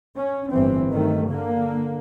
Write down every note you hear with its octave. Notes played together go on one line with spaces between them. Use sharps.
C#4
G1 A2 E3 C4
G2 D#3 A3
D3 A#3